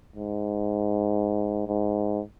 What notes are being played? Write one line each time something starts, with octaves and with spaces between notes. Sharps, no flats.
G#2
G#2